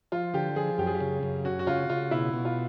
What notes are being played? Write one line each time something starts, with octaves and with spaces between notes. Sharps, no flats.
F3 F4
D3 G4
F3 G#4
F#2 G4
G#4
G4
C#3
F#2
C#4 F#4
F#4
C#3 F4
C#3 F4
B2 E4
B2
F4